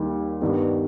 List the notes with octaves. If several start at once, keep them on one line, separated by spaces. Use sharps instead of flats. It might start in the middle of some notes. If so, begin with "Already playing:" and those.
Already playing: D#2 D#3 G3
G2 D#3 G3 B3